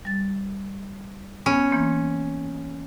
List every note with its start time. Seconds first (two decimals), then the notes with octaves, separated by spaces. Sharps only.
0.05 G3 A6
1.46 B3 C#4
1.72 E3 A#3 C4